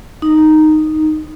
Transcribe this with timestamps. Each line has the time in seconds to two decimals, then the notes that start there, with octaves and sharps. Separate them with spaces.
0.22 D#4